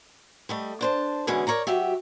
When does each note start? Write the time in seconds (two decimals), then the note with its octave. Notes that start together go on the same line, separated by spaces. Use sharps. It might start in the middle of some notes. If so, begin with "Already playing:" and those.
0.49 G3 A3 D#5
0.81 D4 C5 A5
1.27 B2 D3 E3 G#3 C#4
1.47 A#4 C#5 D5 A#5
1.67 F#3 F#4 G4 E5